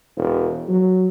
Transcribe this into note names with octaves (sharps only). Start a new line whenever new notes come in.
E1
F#3